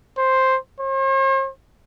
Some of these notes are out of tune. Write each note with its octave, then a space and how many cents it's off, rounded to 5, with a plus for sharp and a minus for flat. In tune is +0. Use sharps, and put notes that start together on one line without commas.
C5 +5
C5 +45